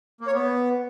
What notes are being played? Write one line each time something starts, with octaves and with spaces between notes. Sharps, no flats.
A#3
C#5
B3